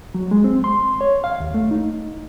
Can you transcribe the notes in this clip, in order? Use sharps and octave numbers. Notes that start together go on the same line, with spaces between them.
F#3
G#3
C4
C6
C#5
F5
D#2
A3
D#4